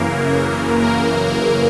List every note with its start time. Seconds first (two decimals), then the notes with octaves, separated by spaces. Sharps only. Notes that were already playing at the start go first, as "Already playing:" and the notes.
Already playing: F#2 C#3 E3 A#3 A#4
0.81 A#3 A#4